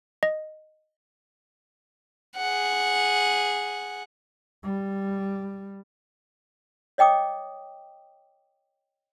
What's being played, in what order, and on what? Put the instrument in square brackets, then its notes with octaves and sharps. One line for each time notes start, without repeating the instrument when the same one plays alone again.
[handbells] D#5
[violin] G#4 F#5
[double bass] G3
[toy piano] C#5 D#5 G5 D6 D#6